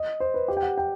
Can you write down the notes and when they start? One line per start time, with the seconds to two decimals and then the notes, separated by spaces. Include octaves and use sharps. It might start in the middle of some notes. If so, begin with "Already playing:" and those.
Already playing: D#5
0.20 C5
0.34 B4
0.48 G4
0.57 G5
0.63 F#5
0.78 G5